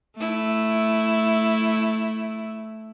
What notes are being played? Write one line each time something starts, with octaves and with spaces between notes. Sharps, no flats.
A3 E4